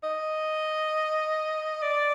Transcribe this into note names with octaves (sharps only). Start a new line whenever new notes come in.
D#5
D5